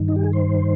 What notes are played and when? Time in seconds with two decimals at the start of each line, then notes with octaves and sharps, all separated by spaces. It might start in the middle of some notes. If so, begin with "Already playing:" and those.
Already playing: G2 D#3
0.08 D#4
0.16 G4
0.24 G#4
0.33 C5